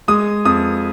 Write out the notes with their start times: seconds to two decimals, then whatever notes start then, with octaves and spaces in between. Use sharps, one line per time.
0.08 G#3 D#6
0.45 F2 D#6